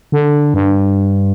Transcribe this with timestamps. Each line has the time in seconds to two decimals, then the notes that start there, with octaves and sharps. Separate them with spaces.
0.12 D3
0.54 G2